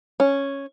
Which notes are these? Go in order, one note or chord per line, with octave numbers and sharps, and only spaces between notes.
C#4